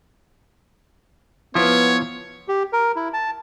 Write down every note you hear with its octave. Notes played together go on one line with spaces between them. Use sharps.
F3 B3 E4 F4 C#5
G4
A#4
E4
A5